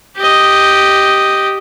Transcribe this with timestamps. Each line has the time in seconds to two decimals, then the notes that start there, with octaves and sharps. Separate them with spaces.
0.17 G4 D#5